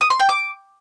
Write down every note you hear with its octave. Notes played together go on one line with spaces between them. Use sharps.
D#6
C6
G5
D6